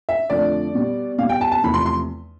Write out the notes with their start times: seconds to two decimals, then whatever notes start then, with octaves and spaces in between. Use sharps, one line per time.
0.09 E5
0.30 F2 D3 F3 A3 D5
0.75 B2 G3
1.18 B2 G3 F5
1.29 G5
1.41 A5
1.52 A5
1.64 E2 C3 F3 A3 B5
1.74 C6
1.86 C6